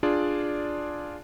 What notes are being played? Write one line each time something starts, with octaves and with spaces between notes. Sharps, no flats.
D4 F4 G#4 D5